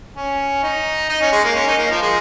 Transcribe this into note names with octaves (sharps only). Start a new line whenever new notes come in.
C#4
D#4
D#4
C#4
G#3
A#3
C#4
D#4
A#3
F3
G#3